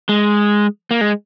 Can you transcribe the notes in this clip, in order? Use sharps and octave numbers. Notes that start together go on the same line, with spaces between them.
G#3
A#3
G#3